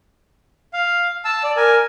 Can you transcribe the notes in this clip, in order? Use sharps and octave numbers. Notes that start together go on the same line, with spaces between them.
F5
A5 E6
D5
A#4 G#5